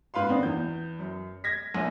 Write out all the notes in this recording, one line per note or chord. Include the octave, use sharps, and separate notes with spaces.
G#2 B4 F5 C6
D#3 B3 C4 D4 D#4
E2 G6
F#2
G#6 A#6 B6
A#1 A#2 C#4 G#5